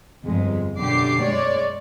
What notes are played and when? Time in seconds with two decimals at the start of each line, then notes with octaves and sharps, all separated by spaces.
0.24 G1 F2 G#3
0.77 F#2 B2 D3 G4 D6 C7
1.20 G#3 C#5 D5